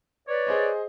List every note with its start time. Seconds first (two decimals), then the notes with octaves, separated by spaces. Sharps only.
0.28 B4 C#5 D5
0.47 G#4 C5 D#5